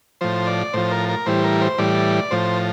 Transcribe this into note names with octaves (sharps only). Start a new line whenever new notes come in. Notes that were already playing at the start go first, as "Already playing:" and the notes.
A2 F3 C5
D5
A2 F3 C5
A#4
A#4
A2 E3 G3 C5
A#4
C5
A2 E3 G3 D5
A2 F3 C5